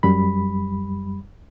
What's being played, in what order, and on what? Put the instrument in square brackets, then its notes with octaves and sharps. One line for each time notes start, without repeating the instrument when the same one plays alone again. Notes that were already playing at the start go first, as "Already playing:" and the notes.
[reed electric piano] F#2 G3 B5